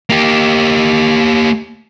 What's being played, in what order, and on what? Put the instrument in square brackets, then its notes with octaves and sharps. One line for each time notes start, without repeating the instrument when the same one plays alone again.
[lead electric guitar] A#3 G4